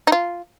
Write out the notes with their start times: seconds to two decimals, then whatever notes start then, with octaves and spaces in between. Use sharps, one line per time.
0.07 D#4
0.12 F4